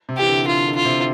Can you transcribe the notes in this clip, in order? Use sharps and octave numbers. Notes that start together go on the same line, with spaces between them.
C3
E3 G4
D3
D3 F4
D3
F4
C3